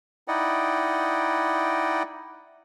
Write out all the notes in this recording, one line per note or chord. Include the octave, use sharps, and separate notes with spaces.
D#4 E4 D5 D#5 F#5 G5